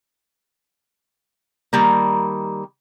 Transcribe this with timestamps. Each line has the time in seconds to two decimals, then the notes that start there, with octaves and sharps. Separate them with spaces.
1.73 D#3 G3 A#3